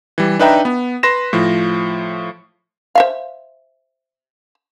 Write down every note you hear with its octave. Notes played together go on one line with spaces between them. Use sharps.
E3 G3
D4 D#4 B4 E5 G5 A#5
B3
B4 C6 A#6 E7
A2 F3
C5 E5 F5